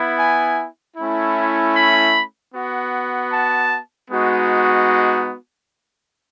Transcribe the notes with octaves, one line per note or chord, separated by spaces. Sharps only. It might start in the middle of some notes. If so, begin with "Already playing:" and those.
Already playing: B3 E4
G#5
A3 C#4 E4
B5
B3 F#4
A5
G#3 B3 D#4 F#4